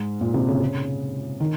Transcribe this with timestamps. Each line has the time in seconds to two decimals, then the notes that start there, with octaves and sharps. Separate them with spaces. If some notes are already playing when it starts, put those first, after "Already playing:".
Already playing: G#2
0.21 A#2
0.34 C3
0.48 C#3
0.60 C#3
1.40 D#3